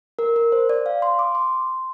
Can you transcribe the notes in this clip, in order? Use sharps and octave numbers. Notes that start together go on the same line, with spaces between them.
A#4
A#4
C5
D5
F5
C6
D6
C6